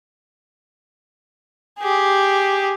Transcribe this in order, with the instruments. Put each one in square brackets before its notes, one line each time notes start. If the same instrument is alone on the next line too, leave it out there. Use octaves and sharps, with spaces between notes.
[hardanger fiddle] G4 G#4